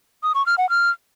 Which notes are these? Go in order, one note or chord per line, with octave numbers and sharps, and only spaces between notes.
D#6
C#6
F6
F#5
F6